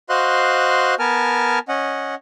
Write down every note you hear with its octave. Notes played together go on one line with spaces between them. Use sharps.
F#4 C5 D#5 F5 C6 F#6
B3 A#4 G#5 A5 F6
C#4 D#5 F#5